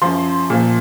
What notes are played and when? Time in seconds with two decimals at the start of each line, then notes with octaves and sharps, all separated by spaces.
0.02 F#2 F3 C6
0.50 A#2 F3